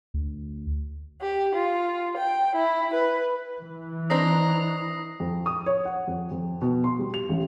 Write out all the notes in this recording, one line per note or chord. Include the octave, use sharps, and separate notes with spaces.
D2
G4
F4
G5
E4
B4
E3
C4 D4 D#4 A#5 D#6 A#6 C7
F2
D#6
C#5
F#5
F2
F2
B2
C6
G3
F7
A1